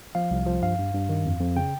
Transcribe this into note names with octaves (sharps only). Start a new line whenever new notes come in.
F3 F5
C2
F3
G2 F5
G2
G2
D#3
F2
F2
C#3 G5